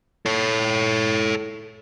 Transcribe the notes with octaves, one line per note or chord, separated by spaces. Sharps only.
A4 C#5